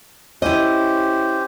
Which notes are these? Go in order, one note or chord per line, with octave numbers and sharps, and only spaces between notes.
C#4 E4 G4 C5 D#5